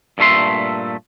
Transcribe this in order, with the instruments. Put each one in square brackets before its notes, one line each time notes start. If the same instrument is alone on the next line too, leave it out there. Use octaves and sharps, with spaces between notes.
[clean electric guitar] G2 A#2 A3 E5 C6